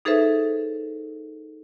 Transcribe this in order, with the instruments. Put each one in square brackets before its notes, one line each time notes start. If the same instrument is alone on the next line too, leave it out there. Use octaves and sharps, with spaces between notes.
[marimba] D#4 G#4 A4 B4 C5 E5